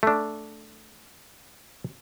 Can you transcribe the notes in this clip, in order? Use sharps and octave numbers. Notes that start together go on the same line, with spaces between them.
A3 D4